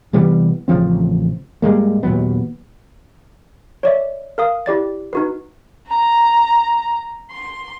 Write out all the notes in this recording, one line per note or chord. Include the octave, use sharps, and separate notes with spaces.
C3 E3 G3 B3
A1 C#3 F3 C4
G#2 G3 G#3 A#3
D#2 A#2 F#3 B3
C#5 D5 E5
A#4 F5 D#6
E4 G4 D5 A6
D#4 F#4 B4
A#5
C6